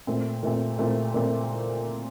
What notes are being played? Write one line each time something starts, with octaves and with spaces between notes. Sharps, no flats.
A#2 A3 C4
A#2 A3 C4
A#2 A3 C4
A#2 A3 C4